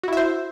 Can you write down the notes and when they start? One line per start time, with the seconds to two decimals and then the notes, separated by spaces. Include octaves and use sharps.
0.03 F#4
0.08 E4
0.13 E5
0.17 C5